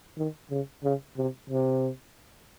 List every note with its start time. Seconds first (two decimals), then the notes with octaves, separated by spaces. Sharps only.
0.17 D#3
0.51 C#3
0.84 C#3
1.17 C3
1.50 C3